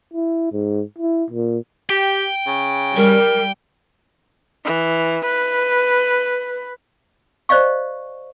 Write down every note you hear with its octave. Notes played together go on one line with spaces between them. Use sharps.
E4
G#2
E4
A#2
G4 G5
C#3
G3 A#4
E3
B4
C5 D5 D#5 F5 C#6